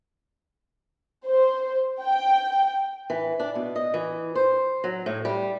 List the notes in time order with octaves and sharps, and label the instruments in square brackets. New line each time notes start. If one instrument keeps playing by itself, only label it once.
[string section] C5
G5
[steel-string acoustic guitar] E3
D4
B2
D#5
E3
C5
F#3
A2
G3